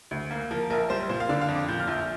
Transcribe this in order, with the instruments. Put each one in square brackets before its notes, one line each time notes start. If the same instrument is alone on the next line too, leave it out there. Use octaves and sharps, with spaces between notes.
[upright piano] D2
A#3
F3 A#4
A#1 A#4
G3 C5
A#2 C5
F5
D3 D5
F5
F2
D6
A#2 G6
F6
A#1 G6